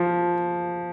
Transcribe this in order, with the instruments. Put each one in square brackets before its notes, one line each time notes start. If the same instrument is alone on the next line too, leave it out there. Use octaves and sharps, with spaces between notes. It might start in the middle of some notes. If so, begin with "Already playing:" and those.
Already playing: [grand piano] F3